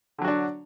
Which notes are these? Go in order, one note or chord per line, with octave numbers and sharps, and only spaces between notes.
D3 F#3 D4 F#4